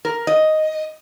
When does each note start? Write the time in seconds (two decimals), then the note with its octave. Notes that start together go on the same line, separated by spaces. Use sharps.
0.05 A#4
0.27 D#5